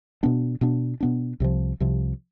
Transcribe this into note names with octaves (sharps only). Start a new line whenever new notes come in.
B2 B3 D4
B2 B3 D4
B2 B3 D4
C2 C3 F3
C2 C3 F3